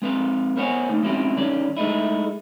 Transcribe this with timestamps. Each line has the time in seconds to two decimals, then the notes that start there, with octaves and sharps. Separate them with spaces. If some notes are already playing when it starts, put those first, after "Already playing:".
0.02 G#3 C4 B4 F5
0.57 B3 A#4 C5 C#5 F#5 G#5
0.89 A3 A#3 D#4
1.03 G#3 C4 C#4 E4 F#4 G4
1.37 G2 D#3 C#4 D5
1.77 G#3 A3 D#4 E4